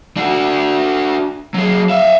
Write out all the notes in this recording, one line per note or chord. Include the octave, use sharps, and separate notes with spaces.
D4 F#4
F#3 G#4
E5 F5